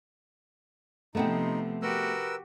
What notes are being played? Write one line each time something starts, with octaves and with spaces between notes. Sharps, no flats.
C3 F3 A3 B3 C4 D#4
F#4 G4 A#4 B4 E6